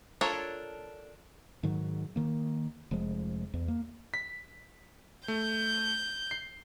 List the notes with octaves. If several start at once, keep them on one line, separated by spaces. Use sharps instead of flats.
D4 F4 A4 A#4 C#5
G#2 D#3 F#3
D#3 A#3
F1 F3 G#3
E2
A#3
B6
A3 G6
C7